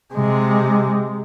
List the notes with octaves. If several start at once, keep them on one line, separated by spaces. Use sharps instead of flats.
C3 G#3